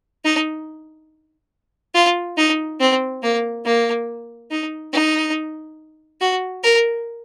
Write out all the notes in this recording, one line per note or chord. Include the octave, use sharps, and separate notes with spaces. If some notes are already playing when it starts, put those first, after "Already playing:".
D#4
F4
D#4
C4
A#3
A#3
D#4
D#4
F#4
A#4